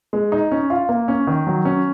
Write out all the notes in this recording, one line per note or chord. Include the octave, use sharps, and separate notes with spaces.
G#3
D#4
C#4
F4
A#3
C#4
D#3
F#3
C#4